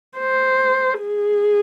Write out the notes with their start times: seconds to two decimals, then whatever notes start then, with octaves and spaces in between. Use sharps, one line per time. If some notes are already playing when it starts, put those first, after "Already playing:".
0.18 C5
1.02 G#4